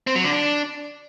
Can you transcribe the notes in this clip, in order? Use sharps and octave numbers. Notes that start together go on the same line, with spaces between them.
C4
F#3
D3
D4